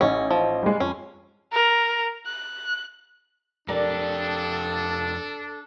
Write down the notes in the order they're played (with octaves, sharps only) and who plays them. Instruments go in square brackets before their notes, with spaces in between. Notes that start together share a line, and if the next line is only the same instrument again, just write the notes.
[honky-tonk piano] A1 D#4 [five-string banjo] C#4
[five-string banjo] F3
[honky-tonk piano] G3 G#3
[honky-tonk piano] F2 [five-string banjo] C#4
[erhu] A#4
F#6
[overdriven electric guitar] F2 G4 [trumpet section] D4 [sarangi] A4 [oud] A#4 D5